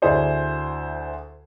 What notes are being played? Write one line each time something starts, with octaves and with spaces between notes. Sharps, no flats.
D2 E4 G#4 C5 D5